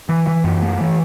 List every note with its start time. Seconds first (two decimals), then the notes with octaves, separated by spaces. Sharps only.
0.09 E3
0.27 E3
0.44 F#2
0.62 A3
0.81 E3